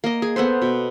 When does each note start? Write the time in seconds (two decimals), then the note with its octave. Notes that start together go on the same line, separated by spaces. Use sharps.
0.04 A#3 D#5
0.22 G#4
0.36 B3 A4 B4 C5
0.62 B2